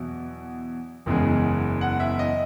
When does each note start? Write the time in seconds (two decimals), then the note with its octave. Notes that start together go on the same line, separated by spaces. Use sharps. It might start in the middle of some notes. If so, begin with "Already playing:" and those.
Already playing: E2 B2 F#3
1.06 F#1 E2 C#3 G#3
1.81 F#5
2.00 E5
2.19 D#5